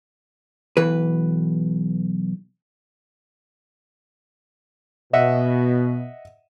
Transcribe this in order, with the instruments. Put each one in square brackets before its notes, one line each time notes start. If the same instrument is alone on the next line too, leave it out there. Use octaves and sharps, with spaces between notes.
[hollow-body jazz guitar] B1 E3 B4
[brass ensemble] B2 [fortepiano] D#5 E5 F#5